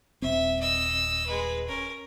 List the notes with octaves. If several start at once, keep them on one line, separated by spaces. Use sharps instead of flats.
D#1 C4 E5
D#5 E6
G#3 B4
C#4 A#4